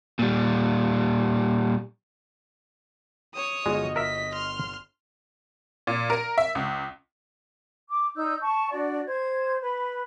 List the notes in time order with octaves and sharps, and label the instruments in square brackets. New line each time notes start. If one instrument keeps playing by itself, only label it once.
[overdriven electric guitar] A#2 G3
[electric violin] C#5 D#6
[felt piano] G1 F4 F#4 [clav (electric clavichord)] G#3 [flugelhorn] D#5
[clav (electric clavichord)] A#4 E5 [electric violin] B6
[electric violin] C6 F6
[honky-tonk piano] A#2
A#4
E5
C#2
[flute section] D6
D#4 D5 E6 G6
A5 C#6
D4 F#4 D5
C5 G#6
B4 B5